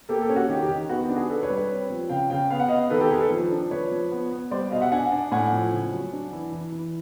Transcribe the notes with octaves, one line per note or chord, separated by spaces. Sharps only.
A#3 G4 A4
G4 A4
C#4
F#4
D#3 G4
G4
D#3
B3 F#4
G4
D4
F#4 G#4
D4 A4 B4
B4 C#5
G3
B4 C#5
C4
F3
C#3 F5 G5
C#3 F5 G5
B3 F5
F#5
B3 D#5 F5
D#3 A4 B4
G4 A4
D#3 G#4 A#4
A4 B4
F3
D4
F3 B4 C#5
F3
B3
B3
G3 C5 D5
B2 D#5 F5
E5 F#5
D4 F#5 G#5
D4
A2 F#5 G#5
F3
C#3
F#3
D4
E3
E3
E3